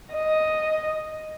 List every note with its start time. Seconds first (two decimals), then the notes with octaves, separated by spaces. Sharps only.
0.14 D#5